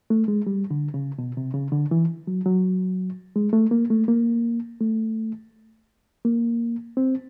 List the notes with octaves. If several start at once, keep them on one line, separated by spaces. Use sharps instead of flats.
A3
G#3
G3
D3
C#3
B2
C3
C#3
D3
E3
F#3
F#3
G#3
A3
A#3
A3
A#3
A3
A#3
C4